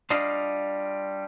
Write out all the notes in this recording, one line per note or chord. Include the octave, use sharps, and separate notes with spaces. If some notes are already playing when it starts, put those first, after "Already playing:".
G3 D4 F4 D#5 F5